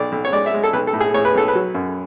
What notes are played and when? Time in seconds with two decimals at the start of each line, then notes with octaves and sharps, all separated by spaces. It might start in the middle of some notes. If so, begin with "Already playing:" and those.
Already playing: B1 D5
0.12 B1
0.25 C#5
0.32 G#3 D5
0.46 E5
0.53 G#3
0.64 A4
0.73 B1 B4
0.87 A4
0.93 A2
1.01 G#4
1.14 A2 C#5
1.25 B4
1.35 B1 A4
1.48 B4
1.55 F#3
1.74 F#2